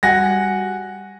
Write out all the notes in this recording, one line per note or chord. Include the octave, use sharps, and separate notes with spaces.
G3 F#4 F#5 G#5 A#6